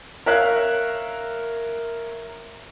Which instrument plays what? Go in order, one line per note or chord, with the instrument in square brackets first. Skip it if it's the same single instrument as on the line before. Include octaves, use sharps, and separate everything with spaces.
[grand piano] A#4 C#5 E5 F5 F#6